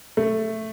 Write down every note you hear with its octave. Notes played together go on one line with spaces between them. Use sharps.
A3